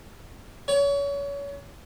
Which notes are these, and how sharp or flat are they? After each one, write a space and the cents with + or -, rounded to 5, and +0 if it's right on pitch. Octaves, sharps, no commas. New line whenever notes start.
C#5 +30